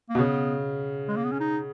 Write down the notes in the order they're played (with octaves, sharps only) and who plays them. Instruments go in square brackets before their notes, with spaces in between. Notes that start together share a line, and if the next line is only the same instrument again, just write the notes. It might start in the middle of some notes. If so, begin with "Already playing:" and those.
[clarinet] A#3
[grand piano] B2
[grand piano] C#3 [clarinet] B3
[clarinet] G#3
A#3
B3
C#4
D#4